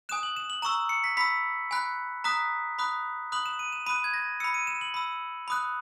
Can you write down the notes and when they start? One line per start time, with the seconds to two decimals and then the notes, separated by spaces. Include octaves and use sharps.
0.09 G#5 D#6 F#6 E7
0.23 F#7
0.36 E7
0.50 F#7
0.62 A#5 C#6 E6 E7
0.89 C#7
1.04 B6
1.17 B5 E6 B6
1.71 G#5 B5 F#6
2.24 A#5 D#6 F#6 B6
2.79 B5 D#6 F#6
3.32 B5 D#6 F#6 F#7
3.46 E7
3.59 D#7
3.72 E7
3.86 B5 D#6 F#6 D#7
4.04 G#6
4.14 A#6
4.40 B5 E6 C#7
4.54 D#7
4.67 E7
4.81 F#7
4.94 B5 E6
5.48 B5 D#6 F#6